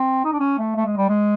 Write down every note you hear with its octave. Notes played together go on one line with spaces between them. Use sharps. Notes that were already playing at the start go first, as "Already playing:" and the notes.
Already playing: C4
D#4
D4
C#4
A3
A3
G#3
G3
G#3